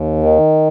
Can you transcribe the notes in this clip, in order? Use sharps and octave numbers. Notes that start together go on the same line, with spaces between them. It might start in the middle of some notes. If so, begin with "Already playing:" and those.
Already playing: D#2
D#3